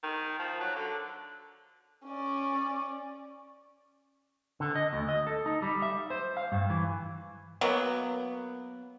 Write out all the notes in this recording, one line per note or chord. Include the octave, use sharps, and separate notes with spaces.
D#3
F3
F#3
D3
C#4 D5
D3
D#5
D2
D#5
A4
D#4
G3
E5
C5
F5
G2
E3
F#3 A#3 B3